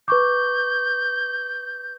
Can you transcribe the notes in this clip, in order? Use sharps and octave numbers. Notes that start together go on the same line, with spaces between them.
B4 C#6 D6 G6